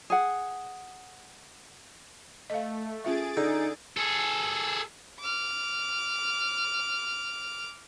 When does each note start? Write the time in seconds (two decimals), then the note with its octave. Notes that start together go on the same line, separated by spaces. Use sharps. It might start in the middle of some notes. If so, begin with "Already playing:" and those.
0.10 G#4 F#5
2.50 A3 D#5 F5
3.04 C#4 F4 G#4 E5 A6 D7
3.37 D3 D#4
3.97 G#4 A4
5.20 D6 F6